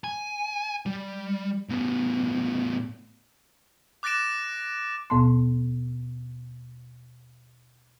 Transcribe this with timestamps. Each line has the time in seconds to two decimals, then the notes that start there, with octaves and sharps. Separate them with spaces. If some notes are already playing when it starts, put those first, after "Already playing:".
0.04 G#5
0.86 G3
1.69 A2 B3
4.03 D6 F#6 A6 A#6 D7 E7
5.10 D#2 B2 B3 A5 C6